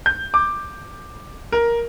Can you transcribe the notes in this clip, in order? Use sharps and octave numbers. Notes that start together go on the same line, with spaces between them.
G6
D6
A#4